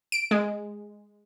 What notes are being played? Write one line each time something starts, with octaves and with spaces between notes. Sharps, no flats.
D7
G#3